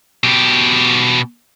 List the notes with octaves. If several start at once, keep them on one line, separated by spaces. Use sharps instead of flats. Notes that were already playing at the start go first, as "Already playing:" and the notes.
B2 G4